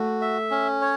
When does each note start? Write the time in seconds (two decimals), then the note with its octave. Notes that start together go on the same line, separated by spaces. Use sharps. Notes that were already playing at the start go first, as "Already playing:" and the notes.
Already playing: A3 F#4
0.21 E5
0.51 C#4
0.81 C#5